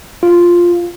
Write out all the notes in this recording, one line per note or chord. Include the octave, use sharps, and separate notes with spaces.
F4